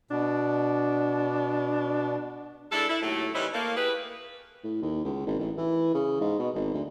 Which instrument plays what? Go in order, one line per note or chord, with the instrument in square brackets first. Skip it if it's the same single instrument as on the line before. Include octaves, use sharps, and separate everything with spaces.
[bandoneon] B2 [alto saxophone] D4
[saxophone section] G#3 D4 E4 A4
E4
D#2 A2 F#3 A3
E3 G3 C4 C#4 D#4 E4
A3 A#3
E4 G4 G#4 B4
[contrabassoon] A2
D#2
C#2
G#1
A1
E3
C#3
G#2
B2
G#1
D2